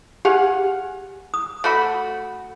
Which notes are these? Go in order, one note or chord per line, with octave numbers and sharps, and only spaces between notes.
G4 G#4 F5 F#5
D#6
A3 F#4 B5